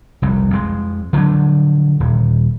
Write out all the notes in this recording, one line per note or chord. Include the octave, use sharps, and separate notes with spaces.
F1 C2
F2 G#3
D3 F3 F#3 D4
D#1